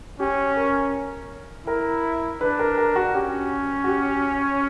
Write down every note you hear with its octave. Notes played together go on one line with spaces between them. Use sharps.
C#4 G4
A#4
E4 A#4
D4 B4
A#4
A#4
F#4
C#4 G4
F#4
G4